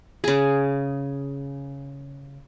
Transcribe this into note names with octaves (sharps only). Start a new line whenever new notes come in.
C#3 G#4